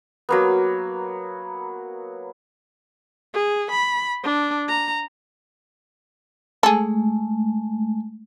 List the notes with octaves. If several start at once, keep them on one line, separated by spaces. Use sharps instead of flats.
F#3 A#3 B3
G#4
B5
D4
A#5
G#3 A3 G#4 A4